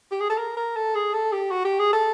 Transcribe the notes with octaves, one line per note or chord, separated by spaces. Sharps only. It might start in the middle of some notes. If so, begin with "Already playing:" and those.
G4
G#4
A4
A#4
A#4
A4
G#4
A4
G4
F#4
G4
G#4
A4